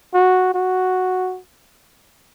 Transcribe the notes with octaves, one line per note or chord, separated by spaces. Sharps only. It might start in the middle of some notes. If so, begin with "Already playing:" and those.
F#4
F#4